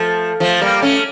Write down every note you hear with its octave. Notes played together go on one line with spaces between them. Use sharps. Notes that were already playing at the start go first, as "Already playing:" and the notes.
Already playing: F3 A3
F3 A3
G3 A#3
A3 C#4